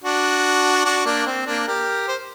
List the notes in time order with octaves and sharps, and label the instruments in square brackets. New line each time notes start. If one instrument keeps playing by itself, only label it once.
[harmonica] D4 F#4
D4 F#4
A#3 D4
C4
A#3 D4
G4 A#4
C5